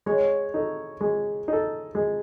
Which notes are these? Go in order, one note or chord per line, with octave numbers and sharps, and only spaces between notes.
G#3 C#5
D#4 A4
G#3
D#4 A4
G#3